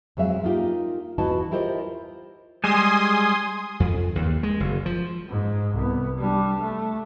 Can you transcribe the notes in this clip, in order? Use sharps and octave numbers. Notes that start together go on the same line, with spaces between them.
F2 F#3 G#3 E5 F5
A#3 D#4 F4 G4
E2 E4 F#4 B4 D#5 A5
E4 F4 G4 A#4 C5 D#5
G3 G#3 G#5 C6 D#6
F2
D#2
G#3
F#1
F3
G#2
C2 B3
G3 D4
A3